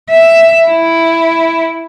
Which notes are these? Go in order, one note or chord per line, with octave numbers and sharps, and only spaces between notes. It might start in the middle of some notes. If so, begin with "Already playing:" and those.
E5
E4